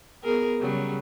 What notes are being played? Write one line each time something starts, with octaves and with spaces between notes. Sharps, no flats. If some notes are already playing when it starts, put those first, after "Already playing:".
B3 G#4 A#4
C#3 F#3 G3